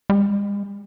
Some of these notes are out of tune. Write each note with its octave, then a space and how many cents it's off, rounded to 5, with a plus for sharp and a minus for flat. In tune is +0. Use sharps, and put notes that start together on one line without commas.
G#3 -45